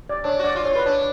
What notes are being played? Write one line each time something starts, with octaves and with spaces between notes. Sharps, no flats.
D5
D4 C#5
F#4
D5
F4
C#5
F4 B4
D4 C#5